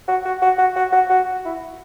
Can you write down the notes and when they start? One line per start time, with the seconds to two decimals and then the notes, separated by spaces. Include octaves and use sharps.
0.08 F#4
0.25 F#4
0.42 F#4
0.58 F#4
0.76 F#4
0.92 F#4
1.10 F#4
1.45 E4